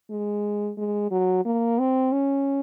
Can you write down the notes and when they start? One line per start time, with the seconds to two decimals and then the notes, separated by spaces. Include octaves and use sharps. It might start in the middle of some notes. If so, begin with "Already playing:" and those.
0.10 G#3
0.78 G#3
1.11 F#3
1.45 A#3
1.79 C4
2.12 C#4